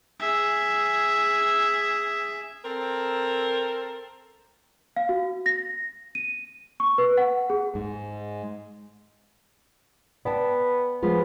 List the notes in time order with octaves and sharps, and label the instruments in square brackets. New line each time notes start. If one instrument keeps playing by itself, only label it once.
[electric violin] G#4 E5
[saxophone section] C4 A4 A#4
[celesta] F5
F#4
A#6
D#7
C#6
B4
F#5
G#4
[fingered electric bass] G#2
[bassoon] B3 [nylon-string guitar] D5 G5 A5
[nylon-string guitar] F3 G#3 F4 [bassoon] B3